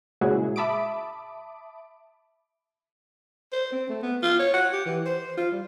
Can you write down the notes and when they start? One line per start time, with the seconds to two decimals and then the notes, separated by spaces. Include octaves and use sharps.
0.21 A#2 C#3 G#3 E4 F#4 G#4
0.56 E5 A5 B5 D6 D#6 D7
3.52 C5
3.72 C4
3.89 A3
4.02 B3
4.22 F4
4.39 C#5
4.54 F#5
4.73 G4
4.86 E3
5.06 C5
5.37 F4
5.52 G3